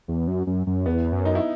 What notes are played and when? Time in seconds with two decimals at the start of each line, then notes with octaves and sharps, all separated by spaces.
0.08 E2
0.28 F#2
0.47 F#2
0.67 F#2
0.86 E2 B3
1.12 F#2
1.25 D#4
1.35 E4